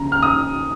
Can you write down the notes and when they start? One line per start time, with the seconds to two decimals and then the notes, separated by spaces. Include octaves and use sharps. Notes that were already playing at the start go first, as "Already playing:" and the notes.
Already playing: C#3 A#5
0.12 F6
0.23 D#6